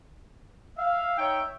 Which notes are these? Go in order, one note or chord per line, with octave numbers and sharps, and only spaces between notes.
E5 F5
D#4 C#5 G5